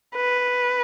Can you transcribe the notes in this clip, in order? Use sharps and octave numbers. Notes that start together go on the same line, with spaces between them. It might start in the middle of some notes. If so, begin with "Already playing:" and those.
B4